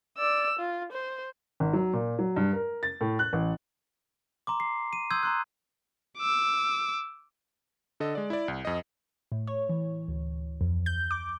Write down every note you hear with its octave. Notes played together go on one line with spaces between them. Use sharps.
D5 E6
F4
C5
G#1
F#3
A#2
F#3
G2
A#4
A6
A2
F#6
A1
A#5 C6 D6
C7
D#7
C6 D#6 E6 G6 G#6
A#5 C6 F#6
D6 E6
D3 A4 D#5
G#3 D5
E4 D5
C2
F2 D#5
A2
C#5
E3
D2
F2
G6
D6